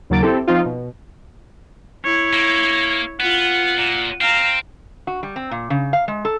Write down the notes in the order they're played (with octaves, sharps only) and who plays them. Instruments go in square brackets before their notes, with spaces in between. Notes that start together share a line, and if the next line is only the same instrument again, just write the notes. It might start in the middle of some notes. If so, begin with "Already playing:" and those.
[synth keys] D#2 C#3 F#3 A#3 A6 D7
C4 E4 G4 A4
F3 C4 D#4 F4
B2
[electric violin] E4 C#5
[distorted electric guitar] A#3
[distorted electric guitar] B3 [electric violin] F4 F#5
[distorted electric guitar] A#2
[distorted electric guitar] C4 [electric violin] F5 A#5
[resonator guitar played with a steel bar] F#4
G3
C4
A#2
C#3
F5
G#3
A4